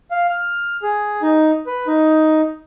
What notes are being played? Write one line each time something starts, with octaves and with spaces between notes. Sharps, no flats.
F5
F6
G#4
D#4
B4
D#4